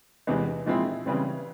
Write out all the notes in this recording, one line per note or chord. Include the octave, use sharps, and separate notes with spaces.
E2 C3 E3 G#3
A#2 F3 G#3 C4 E4
C#3 E3 G3 C4